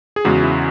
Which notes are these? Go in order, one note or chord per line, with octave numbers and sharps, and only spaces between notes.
G#4
E2 C#3 G#3 F#4
E4